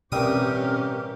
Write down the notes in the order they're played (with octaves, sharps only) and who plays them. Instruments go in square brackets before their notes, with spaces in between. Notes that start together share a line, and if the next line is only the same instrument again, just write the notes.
[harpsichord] A1 G3 D#6 [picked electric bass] B2 C4 [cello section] C#4 G4 [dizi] A#4